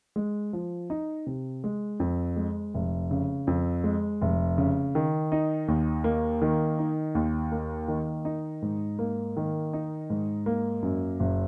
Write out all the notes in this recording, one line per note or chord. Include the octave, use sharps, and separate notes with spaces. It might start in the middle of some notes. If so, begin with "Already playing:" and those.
G#3
F3
D#4
C3
G#3
F2
G#3
F1
C#3
F2
G#3
F1
C#3
D#3
D#4
D#2
A#3
D#3
D#4
D#2
A#3
D#3
D#4
G#2
A#3
D#3
D#4
G#2
A#3
F#2
F#1